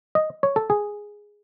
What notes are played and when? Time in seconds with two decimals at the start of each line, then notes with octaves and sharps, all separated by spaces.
0.15 D#5
0.43 C#5
0.56 A4
0.70 G#4